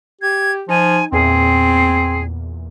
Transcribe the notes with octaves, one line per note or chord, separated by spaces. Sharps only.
G4 G#6
F3 D#4 G#5
E2 A#2 C4 G#4